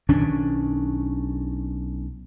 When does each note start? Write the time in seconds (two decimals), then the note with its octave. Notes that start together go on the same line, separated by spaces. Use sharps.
0.09 B1 D#3 C#4 D4